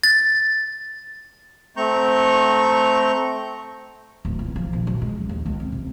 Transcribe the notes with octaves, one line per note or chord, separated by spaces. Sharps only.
A6
A3 C4 A#5 C#6 G6
D1
C#2
F3
A#1
F#2
G#3
D2
D#2
C#2
C4
C3